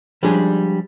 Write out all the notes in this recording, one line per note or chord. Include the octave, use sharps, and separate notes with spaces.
F3 G3 G#3 C#4 D4 G#4